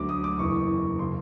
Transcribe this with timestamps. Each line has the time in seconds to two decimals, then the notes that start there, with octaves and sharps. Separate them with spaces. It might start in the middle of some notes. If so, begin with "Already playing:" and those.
Already playing: D2 D3 F#3 D6
0.09 D#6
0.24 D6
0.39 F#1 E2 C#3 E3 C#6
0.99 C#3 C6